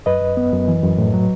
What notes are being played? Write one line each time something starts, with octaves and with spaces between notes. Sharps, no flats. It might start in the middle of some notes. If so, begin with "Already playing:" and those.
F#2 B4 D#5
F#2
B3
F#2
E3
F#2
A2
F#3